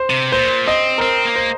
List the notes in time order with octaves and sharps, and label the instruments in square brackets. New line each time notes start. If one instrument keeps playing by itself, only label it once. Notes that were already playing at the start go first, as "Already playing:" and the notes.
Already playing: [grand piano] C5
[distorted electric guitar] C3
[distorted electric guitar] A#2 [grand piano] C5
[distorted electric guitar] C4 [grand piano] D#5
[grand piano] A#4
[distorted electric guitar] C4 [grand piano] C5
[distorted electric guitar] A#3
[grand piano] C5